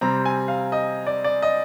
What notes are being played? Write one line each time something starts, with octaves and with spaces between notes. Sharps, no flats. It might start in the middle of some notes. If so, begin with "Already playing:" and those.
C3 G3 C4 A#5
G#5
F5
D#5
D5
D5
D#5